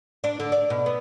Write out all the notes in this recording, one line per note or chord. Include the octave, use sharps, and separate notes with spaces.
D4
D3
D5
B2
B3